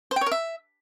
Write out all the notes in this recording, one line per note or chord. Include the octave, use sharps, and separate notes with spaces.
C5
G5
C#5
A#4
E5